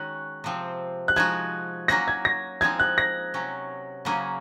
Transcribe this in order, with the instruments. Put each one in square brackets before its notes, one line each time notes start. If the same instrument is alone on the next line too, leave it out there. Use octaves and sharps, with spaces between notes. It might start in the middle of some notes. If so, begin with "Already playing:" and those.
Already playing: [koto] D#3 G#3 C#4 F#4 [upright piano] F#6
[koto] C3 F3 C4
[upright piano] F#6
[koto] F3 G#3 D#4 F#4 [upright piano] G#6
[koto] F#3 A#3 C#4 F#4 [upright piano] A#6
[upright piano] G#6
A#6
[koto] F3 G#3 C4 D#4 [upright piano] G#6
[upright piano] F#6
A#6
[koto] C3 F#3 C#4
C#3 F#3 A#3 C#4 G#4